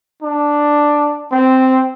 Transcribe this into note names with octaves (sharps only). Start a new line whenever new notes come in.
D4
C4